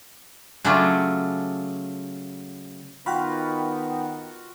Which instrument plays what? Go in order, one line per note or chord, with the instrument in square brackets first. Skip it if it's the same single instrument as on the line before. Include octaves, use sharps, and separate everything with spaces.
[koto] C#3 F#3 A3 D4 F4
[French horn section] D#3 B3 [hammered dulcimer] F4 F#4 F5 [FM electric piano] G5 B5